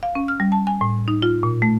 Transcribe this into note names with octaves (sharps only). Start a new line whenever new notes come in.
F5
C#4
F6
G3
A5
G#5
A2
D#4
F4
A#2
A3